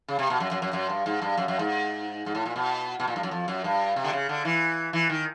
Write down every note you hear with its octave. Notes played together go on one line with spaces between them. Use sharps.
C#3
C3
B2
F#2
F#2
F#2
F#2
G2
G#2
G2
F#2
F#2
G#2
G#2
A2
A#2
B2
B2
A#2
G2
F#2
F2
F#2
G2
C3
D3
C#3
D3
E3
E3
D#3